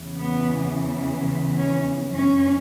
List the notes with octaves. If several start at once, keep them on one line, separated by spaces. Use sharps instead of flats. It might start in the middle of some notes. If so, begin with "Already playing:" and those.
Already playing: E2 C#3 E3
B3
C#4
F#2 E3 C#4